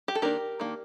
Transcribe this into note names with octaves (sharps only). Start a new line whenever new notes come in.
G4
A4
D#3 A#3 D4 G4 A#4
D#3 A#3 D4